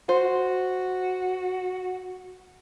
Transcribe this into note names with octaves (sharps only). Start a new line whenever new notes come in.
F#4 C5